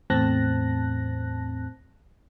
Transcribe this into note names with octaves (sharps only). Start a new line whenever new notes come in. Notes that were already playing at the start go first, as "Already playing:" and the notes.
E2 A2 C4 A5 F#6 A#6